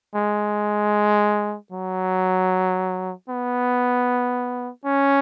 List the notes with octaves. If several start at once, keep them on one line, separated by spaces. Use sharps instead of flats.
G#3
F#3
B3
C#4